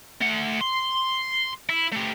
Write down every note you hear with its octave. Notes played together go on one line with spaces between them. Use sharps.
A3 F#5
C6
E4
A3 G4